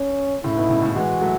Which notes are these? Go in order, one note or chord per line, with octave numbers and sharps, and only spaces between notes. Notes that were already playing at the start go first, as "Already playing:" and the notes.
Already playing: C#4
A2 C#3 E4
G#2 B2
A2 C#3
A2 C#3
E3 G#3 F#4
F#3 A3